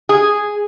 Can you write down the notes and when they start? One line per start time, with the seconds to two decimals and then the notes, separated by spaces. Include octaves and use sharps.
0.09 G#4